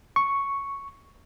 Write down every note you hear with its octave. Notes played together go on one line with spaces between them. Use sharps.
C#6